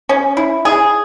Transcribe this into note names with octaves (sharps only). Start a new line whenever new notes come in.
C#4
E4
G#4